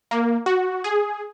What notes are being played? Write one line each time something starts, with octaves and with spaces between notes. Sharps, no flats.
A#3
F#4
G#4